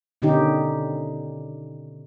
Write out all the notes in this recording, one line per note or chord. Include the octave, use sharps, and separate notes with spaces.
B2 D3 D#3 C#4 D#4 G4